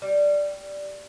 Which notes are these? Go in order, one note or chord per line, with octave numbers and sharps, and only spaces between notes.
G3